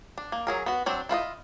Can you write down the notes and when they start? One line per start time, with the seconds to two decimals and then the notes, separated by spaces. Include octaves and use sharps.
0.18 D4
0.32 A#3
0.47 F#3 G#4 A#4
0.66 B3 F#4
0.86 F#3 C4 D4
1.09 E4 F4 B4 D#5